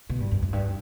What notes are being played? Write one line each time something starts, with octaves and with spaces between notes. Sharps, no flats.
B2
G2
F#2
F#2
G2